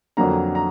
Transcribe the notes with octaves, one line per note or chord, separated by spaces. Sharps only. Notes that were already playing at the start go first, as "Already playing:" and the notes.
F2 D3 F#3 A#3 A#5
A#5